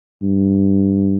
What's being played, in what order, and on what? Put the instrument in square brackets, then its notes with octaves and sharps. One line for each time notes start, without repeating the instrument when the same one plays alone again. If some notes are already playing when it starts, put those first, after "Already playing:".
[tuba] G2